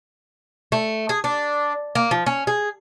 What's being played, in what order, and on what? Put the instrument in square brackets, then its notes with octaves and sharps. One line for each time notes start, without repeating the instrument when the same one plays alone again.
[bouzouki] A3
G#4
D4
A#3
F3
C#4
G#4